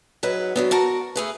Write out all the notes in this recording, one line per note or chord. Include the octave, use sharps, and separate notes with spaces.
G#2 F#3 B4
D3 F#3 B3
F#4 A#4 A5
A3 G#4 B4